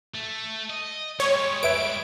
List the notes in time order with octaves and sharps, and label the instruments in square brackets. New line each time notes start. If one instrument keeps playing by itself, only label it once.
[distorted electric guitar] A3
D#5
[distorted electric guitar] G3 G#3 [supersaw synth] C#5
[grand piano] B4 E5 G#6 [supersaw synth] D7